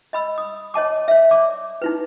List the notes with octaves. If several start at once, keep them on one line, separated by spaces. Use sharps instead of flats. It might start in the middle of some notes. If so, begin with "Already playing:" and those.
D#5 B5 E6
D#6
C#5 D#5 A5 D6
C#5 E5
D5 D6
D#4 E4 B4